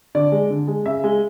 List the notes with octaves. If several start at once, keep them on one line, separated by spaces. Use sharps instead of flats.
D3 D5
G#3
D3
G#3
C#3 E5
G#3